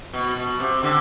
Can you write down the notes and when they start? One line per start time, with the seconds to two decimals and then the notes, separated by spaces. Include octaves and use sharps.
0.13 B2
0.36 B2
0.60 C3
0.83 D3